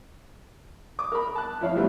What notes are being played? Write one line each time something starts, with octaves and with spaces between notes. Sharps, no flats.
D6 D#6
A#4 B5
A5 F#6
F2 E4 C#5 F5
C3 F#3 G3 A3 B3 C4